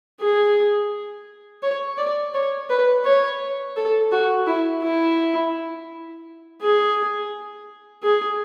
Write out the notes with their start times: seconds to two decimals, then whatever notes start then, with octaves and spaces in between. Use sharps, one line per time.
0.20 G#4
1.63 C#5
1.98 D5
2.34 C#5
2.70 B4
3.05 C#5
3.77 A4
4.12 F#4
4.47 E4
4.83 E4
6.61 G#4
8.03 G#4